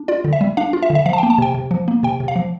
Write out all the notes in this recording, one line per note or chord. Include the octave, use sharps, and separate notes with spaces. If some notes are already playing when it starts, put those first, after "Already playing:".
Already playing: D4
F4 D5
D3
E5
G3
D4 F5
F4
E5
D3
E5
F3 F5
A5
A#3 G5
A5
C3 G5
C3
F3
A#3
C3 G5
C3
F5
F3